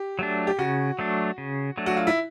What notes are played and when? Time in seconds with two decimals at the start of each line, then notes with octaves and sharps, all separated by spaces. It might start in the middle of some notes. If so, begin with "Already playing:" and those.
Already playing: G4
0.19 F#3 A3 D4
0.47 G4
0.59 C#3 F#4
0.99 F#3 A3 D4
1.38 C#3
1.78 F#3 A3 D4
1.86 F#4
1.97 F4
2.07 E4